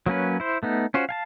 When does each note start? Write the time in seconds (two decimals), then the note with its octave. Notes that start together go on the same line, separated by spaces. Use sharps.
0.06 F#3 A#3 C#4 B4
0.40 E4 C5
0.63 A3 B3 D#4
0.94 C#4 F4 F#4 C5
1.09 F5 G#5 A5